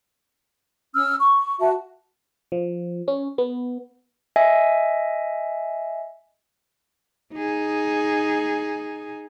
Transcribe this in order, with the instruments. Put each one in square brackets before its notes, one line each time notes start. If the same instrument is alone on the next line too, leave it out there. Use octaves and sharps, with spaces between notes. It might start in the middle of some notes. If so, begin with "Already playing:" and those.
[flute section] C#4 E6 F6
C#6
F#4 E5 A5
[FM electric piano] F3
C#4
B3
[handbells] D#5 E5 G#5
[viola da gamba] D#4 G#4